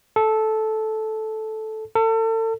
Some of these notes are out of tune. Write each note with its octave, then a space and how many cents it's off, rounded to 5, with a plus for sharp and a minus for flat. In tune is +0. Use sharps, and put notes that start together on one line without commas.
A4 -10
A4 +35